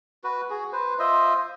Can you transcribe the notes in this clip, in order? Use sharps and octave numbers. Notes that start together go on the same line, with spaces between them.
F#4 B4
F#4 G#4
B4 C5
F4 C5 D#5 E5